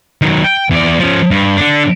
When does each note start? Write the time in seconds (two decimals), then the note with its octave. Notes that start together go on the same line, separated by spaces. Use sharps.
0.22 D#3 F#3
0.44 G5
0.70 E2 D5
0.99 F3 C#4
1.31 G2
1.57 D3 D4